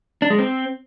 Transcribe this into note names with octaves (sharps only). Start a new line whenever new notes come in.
D4
G#3
C4